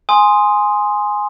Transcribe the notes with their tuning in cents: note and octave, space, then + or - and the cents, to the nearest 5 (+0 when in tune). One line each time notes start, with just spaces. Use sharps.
G#5 +0 C6 +0 D#6 +0